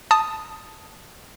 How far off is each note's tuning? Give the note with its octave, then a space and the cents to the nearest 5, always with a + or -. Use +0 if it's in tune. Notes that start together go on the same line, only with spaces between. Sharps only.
A5 +0 D#6 +0